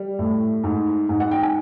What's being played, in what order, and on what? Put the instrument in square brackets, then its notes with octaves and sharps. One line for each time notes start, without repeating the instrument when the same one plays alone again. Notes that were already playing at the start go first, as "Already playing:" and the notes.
Already playing: [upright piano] G3
A2
G#2
G#2
F#5
G5
G#5